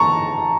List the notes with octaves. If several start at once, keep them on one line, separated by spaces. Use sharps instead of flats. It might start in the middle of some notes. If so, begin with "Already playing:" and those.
Already playing: A5 A#5 C#6